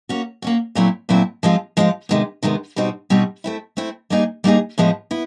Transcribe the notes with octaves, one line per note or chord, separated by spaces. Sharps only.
A#3 C#4 F#4
A#3 C#4 F#4
A#2 F#3 A3 C4 E4
A#2 F#3 A3 C4 E4
F3 G#3 C4 F4
F3 G#3 C4 F4
C3 D#3 G#3 B3
C3 D#3 G#3 B3
B2 G3 C4 D#4 F#4
B2 G3 C4 D#4 F#4
A3 C4 E4
A3 C4 E4
G3 A#3 D#4 G#4
G3 A#3 D#4 G#4
A2 F3 G#3 B3 E4
B3 E4